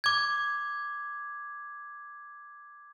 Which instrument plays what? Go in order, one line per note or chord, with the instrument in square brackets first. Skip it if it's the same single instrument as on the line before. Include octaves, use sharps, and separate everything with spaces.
[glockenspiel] D6 G#6